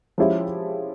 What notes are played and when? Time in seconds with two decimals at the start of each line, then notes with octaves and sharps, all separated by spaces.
0.18 F3 G#3 C#4 E4 G4